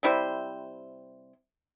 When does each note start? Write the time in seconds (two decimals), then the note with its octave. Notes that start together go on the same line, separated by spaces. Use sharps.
0.03 C3 G3 E4 C5